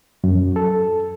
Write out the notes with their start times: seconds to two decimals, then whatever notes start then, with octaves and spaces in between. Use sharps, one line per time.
0.24 F#2
0.56 A4